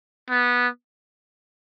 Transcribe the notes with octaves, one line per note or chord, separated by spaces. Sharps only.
B3